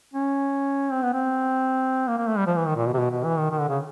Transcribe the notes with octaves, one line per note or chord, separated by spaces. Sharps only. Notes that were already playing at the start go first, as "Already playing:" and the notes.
C#4
C4
B3
C4
A#3
A#3
A3
G3
F3
E3
D#3
A#2
B2
C3
B2
B2
E3
D#3
D#3
D3
C#3